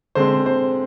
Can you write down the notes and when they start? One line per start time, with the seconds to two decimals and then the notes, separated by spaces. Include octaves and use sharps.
0.15 D3 G#3 C4 C5
0.46 C5